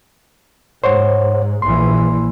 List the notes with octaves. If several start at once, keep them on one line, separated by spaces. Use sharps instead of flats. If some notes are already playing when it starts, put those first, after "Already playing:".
G#2 C5 C#5 F#5
A#1 A#2 E3 C6